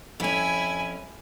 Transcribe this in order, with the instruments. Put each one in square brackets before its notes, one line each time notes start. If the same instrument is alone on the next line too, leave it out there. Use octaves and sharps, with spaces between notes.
[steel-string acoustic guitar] F2 C#4 [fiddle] E4 G#5